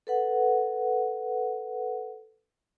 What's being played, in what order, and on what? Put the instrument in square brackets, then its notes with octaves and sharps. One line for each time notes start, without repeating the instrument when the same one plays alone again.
[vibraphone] A4 B4 F#5